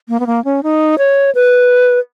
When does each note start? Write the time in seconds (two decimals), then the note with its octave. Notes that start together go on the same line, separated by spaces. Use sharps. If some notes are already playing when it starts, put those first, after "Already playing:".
0.09 A#3
0.20 B3
0.27 A#3
0.45 C#4
0.63 D#4
0.98 C#5
1.35 B4